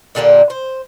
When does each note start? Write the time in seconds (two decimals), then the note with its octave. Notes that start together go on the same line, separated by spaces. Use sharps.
0.15 A#2 D3 G3 A#3
0.50 C5